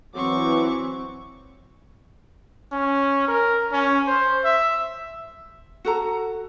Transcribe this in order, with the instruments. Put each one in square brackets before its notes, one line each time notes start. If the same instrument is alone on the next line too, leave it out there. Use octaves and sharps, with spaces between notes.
[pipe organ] E3 [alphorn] F#3 [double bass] C4 [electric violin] C#6 D6
[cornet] C#4
A#4
C#4
C5
E5
[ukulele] F#4 A4 A#5